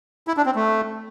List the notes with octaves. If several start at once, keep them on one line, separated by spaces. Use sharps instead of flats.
E4
D4
C4
A3